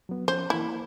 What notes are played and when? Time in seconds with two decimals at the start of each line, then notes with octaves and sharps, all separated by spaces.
0.09 F#3 B3
0.28 F3 C#4 C5
0.50 E3 A#3 E4